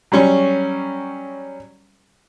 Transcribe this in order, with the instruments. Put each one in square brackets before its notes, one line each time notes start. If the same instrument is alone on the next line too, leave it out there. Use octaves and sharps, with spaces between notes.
[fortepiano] F#3 G3 C#4 C#6